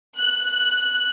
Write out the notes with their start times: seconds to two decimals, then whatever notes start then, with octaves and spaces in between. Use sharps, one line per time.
0.15 F#6